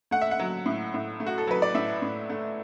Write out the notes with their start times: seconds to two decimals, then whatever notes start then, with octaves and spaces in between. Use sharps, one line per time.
0.11 A3 F#5
0.21 E5
0.31 F#5
0.39 F#3
0.66 A2
0.94 A2
1.20 A3
1.26 F#4
1.38 A4
1.47 F#3 B4
1.62 D5
1.74 A2 E5
2.02 A2
2.30 A3